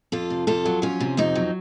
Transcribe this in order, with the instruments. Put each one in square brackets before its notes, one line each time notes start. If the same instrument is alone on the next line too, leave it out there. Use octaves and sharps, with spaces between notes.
[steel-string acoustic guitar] F2 F4 A4
C3
F2 F4 A4
F#3
F2 C#4 F4
C3
F2 C4 D#4
F#3